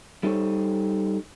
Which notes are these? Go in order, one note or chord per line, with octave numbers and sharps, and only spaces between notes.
G3 D#4 A4 C5 C#5